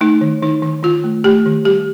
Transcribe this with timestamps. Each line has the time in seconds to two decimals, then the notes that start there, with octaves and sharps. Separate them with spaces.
0.01 A3 D#4
0.21 D#3
0.42 D#3 D#4
0.62 D#3
0.83 D#3 F4
1.04 A3
1.24 A3 G4
1.46 D#3
1.65 G3 G4